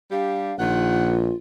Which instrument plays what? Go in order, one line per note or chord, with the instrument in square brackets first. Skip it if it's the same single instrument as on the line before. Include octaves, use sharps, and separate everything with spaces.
[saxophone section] G3 D4 G4 [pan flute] F5
[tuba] A#1 [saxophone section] D#3 F#5 [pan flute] F4